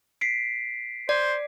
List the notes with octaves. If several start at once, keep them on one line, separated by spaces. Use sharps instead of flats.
B6 C7 D7
C5 D5